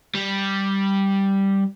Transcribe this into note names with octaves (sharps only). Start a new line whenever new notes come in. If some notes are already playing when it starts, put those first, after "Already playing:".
G3